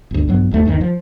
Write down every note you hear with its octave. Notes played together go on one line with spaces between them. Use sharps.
G1 D2
A#1 G2 F#3 B3
G1 D#2 A3
G1 D#2 B2 D#3
F3